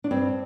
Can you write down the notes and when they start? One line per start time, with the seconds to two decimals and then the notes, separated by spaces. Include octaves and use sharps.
0.04 D4
0.11 G2 C4